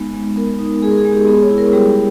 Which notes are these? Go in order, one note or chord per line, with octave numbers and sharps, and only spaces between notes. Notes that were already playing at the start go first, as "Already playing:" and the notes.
Already playing: G#3 B3 D#4
G#3
B3 A#4
D#4
G#3 G#4
A#4
G#4
G#3
G4
B3 G#4
C#5
E4
A#4
G3 G4